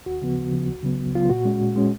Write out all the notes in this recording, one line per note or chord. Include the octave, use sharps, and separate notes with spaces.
D#2 F#4
C#3 F3 B3
D#2
C#3 F3 B3
C#2
C#3 F#3 B3
C#2
C#3 F#3 B3 F4
A#2 F#4
G#3 C#4
A#2
G#3 C#4